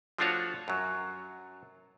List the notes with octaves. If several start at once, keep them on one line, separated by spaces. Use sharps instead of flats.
F3 A3 D4 F4 F#4 C#5
F#2 F#3